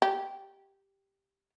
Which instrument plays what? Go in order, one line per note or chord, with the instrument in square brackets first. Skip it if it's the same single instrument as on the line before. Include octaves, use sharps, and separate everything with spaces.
[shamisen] G4